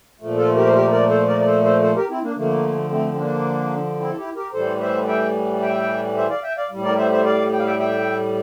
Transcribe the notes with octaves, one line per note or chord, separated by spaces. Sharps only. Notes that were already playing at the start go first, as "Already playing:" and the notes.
A#2 F3 A3
F4 A4
G4 A#4
C5
G4 A#4
A#4 D5
A4 C5
A#4 D5
D5
A4 C5
A4 C5
A4 C5
G4 A#4
C4 E4
A#3 D4
D3 F3 A3 A#3
A3 C4
C4
A#3 D4
C4 E4
A4
E4 G4
G4 A#4
A2 E3 G3 A4 C5
C5 E5
E5 G5
E5 G5
C5 E5
D5 F5
E5 G5
D5 F5
A2 G3
A#4 D5
C5 E5
C5 E5
D5 F5
G5
F5
E5 G5
E5 G5